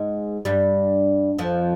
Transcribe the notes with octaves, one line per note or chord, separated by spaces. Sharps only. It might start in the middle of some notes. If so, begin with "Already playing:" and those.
Already playing: G#2 G#3
G2 G3
F2 F3